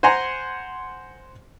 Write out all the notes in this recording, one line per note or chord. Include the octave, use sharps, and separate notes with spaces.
C5 F#5 G#5 A#5 C6